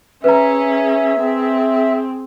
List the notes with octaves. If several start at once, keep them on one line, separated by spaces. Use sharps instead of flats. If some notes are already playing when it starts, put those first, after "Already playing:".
C#4 G#4 B4 E5 A#5
C4